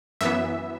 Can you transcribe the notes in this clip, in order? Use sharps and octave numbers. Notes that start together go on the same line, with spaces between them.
F#2 E3 B3 E5